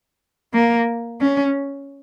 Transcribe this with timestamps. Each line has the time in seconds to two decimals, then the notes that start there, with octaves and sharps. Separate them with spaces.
0.54 A#3
1.21 C#4